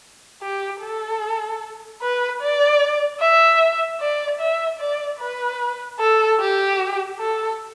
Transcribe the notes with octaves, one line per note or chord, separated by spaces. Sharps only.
G4
A4
B4
D5
E5
D5
E5
D5
B4
A4
G4
A4